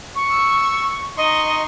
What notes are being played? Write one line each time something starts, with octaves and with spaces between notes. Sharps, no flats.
C#6
E6
D#4 D#5 C6 C#6